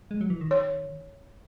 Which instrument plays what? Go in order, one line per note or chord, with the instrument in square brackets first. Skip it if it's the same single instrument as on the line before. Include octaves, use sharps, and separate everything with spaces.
[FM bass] G#3
F#3
E3
D#3
[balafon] C#5